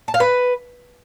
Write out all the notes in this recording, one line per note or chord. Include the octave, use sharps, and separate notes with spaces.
A5
F5
B4